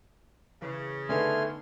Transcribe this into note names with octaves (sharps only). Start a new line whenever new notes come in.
C#3 E3
D3 A3 B3 D#4 G#5 C6 F6